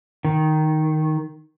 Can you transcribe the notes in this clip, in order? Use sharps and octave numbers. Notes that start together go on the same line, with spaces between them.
D#3